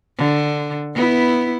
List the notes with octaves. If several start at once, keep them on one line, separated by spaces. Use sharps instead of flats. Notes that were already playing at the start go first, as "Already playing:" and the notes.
D3
B3 E4